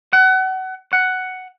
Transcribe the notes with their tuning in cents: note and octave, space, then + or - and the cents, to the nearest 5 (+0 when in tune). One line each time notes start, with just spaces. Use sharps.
F#5 +30
F#5 +5